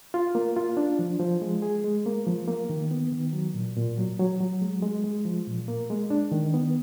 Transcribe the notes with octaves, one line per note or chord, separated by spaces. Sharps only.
F4
A#3
F4
D4
F3
F3
G#3
G#4
G#3
A#3
F3
A#3
D#3
B3
D#3
F#3
A#2
A#2
F#3
F#3
F#3
G#3
G#3
G#3
F3
A#2
A#3
G#3
D4
D#3
B3